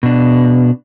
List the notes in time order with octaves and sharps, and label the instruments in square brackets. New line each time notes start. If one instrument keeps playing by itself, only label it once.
[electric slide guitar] B2 D4